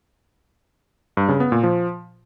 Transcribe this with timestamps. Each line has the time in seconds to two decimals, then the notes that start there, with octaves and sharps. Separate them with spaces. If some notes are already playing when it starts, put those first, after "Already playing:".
1.17 G2
1.29 C#3
1.40 B3
1.52 A#2
1.63 F3